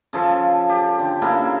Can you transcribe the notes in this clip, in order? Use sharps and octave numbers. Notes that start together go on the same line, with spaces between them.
C#3 F3 A4
G4
D3
C#3 A#3 E4